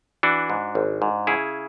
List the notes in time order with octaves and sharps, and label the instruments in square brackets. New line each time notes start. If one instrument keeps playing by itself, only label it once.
[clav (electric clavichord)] E3 D4 F#4
G#2
G#1
G#2
C#3 E4 G#4